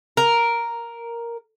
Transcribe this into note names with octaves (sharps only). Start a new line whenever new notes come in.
A#4